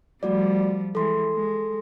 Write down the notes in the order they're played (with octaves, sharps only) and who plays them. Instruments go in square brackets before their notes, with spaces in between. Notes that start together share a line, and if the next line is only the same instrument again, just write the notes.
[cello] F3 G3 [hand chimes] A3 F#4 D5
[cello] E3 G#3 [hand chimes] A4 C6
[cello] G#3